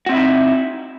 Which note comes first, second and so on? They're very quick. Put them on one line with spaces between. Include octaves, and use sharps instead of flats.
F#4 C4 E5 E4 D#4